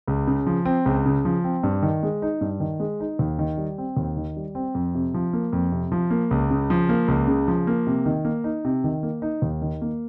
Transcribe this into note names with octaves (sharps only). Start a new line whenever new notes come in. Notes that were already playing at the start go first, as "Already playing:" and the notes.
C#2
C#3
F3
C4
C#2
C#3
F3
C4
G2
D#3
G#3
D#4
G2
D#3
G#3
D#4
D#2
D#3
G3
C4
D#2
D#3
G3
C4
F2
C3
F3
A#3
F2
C3
F3
A#3
C#2
C#3
F3
A#3
C#2
C#3
F3
A#3
C3
D#3
A#3
D#4
C3
D#3
A#3
D#4
D#2
D#3
A#3